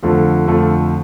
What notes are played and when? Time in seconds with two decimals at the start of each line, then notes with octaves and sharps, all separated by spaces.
0.03 F2 D3 F3 A3
0.47 F2 D3 F3 A3